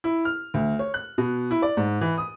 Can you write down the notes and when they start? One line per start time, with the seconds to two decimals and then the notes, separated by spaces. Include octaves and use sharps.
0.04 E4
0.25 F6
0.54 D2
0.79 C#5
0.94 F#6
1.18 B2
1.51 E4
1.62 D5
1.77 G#2
2.01 E3
2.18 D#6